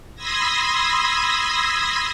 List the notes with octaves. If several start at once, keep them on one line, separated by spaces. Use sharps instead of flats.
B5 C6 D#6 E6 G#6 A#6